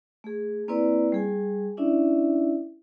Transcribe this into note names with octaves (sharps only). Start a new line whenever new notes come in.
A3 G#4
A#3 C4 E4 B4 D5
G3 G#4 G#5
C#4 D4 E4 D5 E5